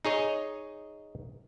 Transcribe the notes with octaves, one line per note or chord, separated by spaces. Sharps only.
D#4 G#4 C#5 D#5